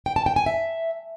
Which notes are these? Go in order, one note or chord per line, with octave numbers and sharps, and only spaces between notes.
G5
A5
G5
G#5
E5